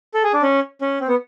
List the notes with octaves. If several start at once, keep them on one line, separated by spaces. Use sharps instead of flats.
A4
G#4
D4
C#4
C#4
C4
B3